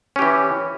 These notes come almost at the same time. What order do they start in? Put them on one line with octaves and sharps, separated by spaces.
C#4 G4 E3